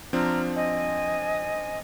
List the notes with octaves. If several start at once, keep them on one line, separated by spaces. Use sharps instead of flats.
F3 C4 D4 A#5 F6
D#5 G#5